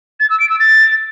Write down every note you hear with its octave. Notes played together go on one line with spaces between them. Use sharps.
A6
E6
D7
E6
A6